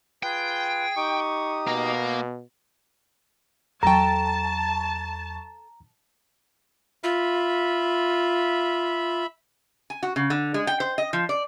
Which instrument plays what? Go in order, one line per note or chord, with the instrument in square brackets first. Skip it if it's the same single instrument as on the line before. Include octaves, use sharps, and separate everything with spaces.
[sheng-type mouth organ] F4 B4 [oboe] G#4 [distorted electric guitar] G5
[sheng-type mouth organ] D#4 G4 D#6 [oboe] C#6
[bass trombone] B2 [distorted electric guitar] A#3 [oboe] A#5
[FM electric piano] E2 F#3 C#6 [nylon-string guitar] A4 G5 [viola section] A5 [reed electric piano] A#5
[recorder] F4 [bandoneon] E5 B5
[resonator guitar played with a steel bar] G#5
F#4
C#3
D3
G#3
G5
C5
D#5
F3
D5